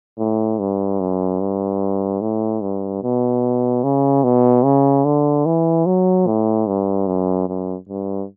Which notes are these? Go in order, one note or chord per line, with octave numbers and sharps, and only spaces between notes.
A2
G2
F#2
G2
A2
G2
B2
C#3
B2
C#3
D3
E3
F#3
A2
G2
F#2
F#2
G2